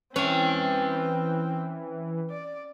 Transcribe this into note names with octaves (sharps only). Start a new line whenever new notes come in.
E3 C4 C#4 B4 G5
D5